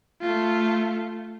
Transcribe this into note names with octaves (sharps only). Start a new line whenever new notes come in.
A3 F4